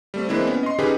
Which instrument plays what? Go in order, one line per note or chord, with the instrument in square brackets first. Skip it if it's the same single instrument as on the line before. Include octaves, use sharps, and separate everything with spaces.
[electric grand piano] G3 A3 C4
E3 G#3 A#3 C4 D4 E4
B3 C#4
D#5 C6
D3 C#4 D#4 G4 G#4 B4